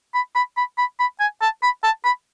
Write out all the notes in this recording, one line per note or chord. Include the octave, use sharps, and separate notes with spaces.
B5
B5
B5
B5
B5
G#5
A5
B5
A5
B5